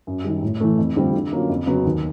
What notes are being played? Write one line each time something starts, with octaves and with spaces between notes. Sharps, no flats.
F#2
D#3 G3
A2
E3 A3
F2
D3 G3 C4 F4
D3
F#3 A#3 C#4 F4
F2
C#3 F#3 B3
D#2